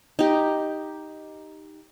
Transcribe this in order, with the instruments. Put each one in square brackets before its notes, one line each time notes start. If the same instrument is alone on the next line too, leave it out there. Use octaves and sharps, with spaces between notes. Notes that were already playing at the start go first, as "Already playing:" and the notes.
[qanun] D#4 G4